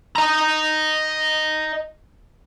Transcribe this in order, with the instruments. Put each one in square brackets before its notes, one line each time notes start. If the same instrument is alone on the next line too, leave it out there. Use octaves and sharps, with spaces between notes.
[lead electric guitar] D#5 A#5